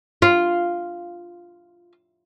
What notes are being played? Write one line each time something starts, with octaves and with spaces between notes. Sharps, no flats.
F4